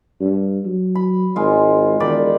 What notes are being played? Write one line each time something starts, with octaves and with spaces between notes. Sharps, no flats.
G2
F#3
B5
G#1 G#3 F4
E1 D#3 D5 B5